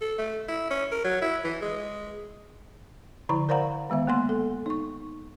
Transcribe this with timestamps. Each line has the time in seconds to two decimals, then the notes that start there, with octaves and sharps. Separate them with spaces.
0.01 A4
0.18 A3
0.48 E4
0.71 C#4
0.92 A#4
1.04 F#3
1.21 E4
1.44 E3
1.61 G#3
3.29 D3 F3 E4 A#5 C#6
3.49 A#4 C5 D5 F5 F#5 A#5
3.90 D#3 G#3 B3 E5
4.07 A#3 B3 F#5 C6
4.29 A4
4.66 D#4 C#6